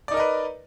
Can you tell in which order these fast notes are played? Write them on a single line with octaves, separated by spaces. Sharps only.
D5 D#4 A#4 D#5 B4